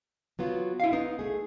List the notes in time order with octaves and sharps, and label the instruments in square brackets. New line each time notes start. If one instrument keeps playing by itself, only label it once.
[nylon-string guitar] F#3 B3 F4
[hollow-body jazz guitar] E4 F5
[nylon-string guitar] B3 [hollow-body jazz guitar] D#4
[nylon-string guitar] A3 G#4